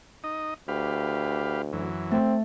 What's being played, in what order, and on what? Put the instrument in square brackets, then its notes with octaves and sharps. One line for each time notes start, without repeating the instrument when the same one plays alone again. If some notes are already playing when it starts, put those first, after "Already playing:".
[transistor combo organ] D#4 D#5
[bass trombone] D2 [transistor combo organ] G4 B4 F5
[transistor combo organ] F#2 E3
[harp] A3 [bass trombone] C4